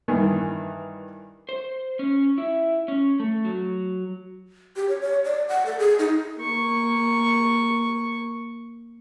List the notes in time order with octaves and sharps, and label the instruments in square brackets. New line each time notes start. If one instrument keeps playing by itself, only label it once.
[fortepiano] G2 D#3 E3
[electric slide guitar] C5
C#4
E4
C#4
A3
F#3
[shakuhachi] G4
C#5
C#5
D5
F#5
A4
G#4
D#4
[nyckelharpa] A#3 C#6